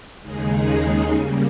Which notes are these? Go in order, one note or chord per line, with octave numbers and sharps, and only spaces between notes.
D#2 C#3 G#3 D#4 G#4
C#3 G3 A#3